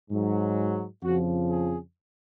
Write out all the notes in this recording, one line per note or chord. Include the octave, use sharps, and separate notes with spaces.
G#2 F#3
F2 C#3 F3 F#4
G#4